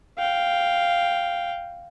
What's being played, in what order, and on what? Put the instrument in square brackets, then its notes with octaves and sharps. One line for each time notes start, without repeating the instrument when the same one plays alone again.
[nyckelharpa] F5 G5